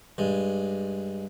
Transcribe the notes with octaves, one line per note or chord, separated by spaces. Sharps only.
G2 G#3